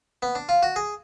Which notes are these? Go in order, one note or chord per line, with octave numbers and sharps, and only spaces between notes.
B3
D4
F4
F#4
G#4